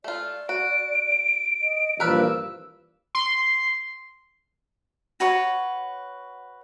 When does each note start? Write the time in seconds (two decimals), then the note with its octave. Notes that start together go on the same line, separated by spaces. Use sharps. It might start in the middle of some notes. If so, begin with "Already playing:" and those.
0.04 A3 F4 D5
0.49 F#4 D7
1.61 D#5
2.00 G2 A#2 E3 F3 A#4 B4 D5 E6
3.15 C6
5.20 F#4 B4 C#5 F#5